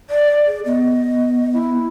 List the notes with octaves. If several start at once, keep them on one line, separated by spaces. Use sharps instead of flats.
D5
G#4
B3 D#5
E4